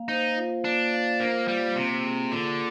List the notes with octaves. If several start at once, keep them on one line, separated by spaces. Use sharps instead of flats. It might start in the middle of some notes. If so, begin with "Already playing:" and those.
Already playing: A#3 F5
D#4 C5
F4
A#3 D4
F5
A#3 C5
G3 F4
C3 A#3
G#4
D3 F4